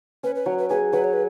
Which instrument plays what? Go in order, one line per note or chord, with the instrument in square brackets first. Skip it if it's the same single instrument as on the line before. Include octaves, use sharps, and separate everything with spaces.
[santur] C#4 [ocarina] B4
[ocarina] B4
[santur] F#3 [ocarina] C#5
[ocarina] B4
[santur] G#4 [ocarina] B4
[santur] F#3 [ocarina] B4
[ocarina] C#5
B4